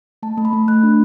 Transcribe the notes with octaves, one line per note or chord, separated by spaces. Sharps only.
A3 A5
A3
B5
A3
A3 F#6
D4